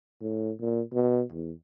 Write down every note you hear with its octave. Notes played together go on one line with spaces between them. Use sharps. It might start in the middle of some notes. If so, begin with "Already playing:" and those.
A2
A#2
B2
E2